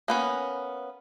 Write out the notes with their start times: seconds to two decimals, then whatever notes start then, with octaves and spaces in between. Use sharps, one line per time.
0.08 A#3 B3 C#4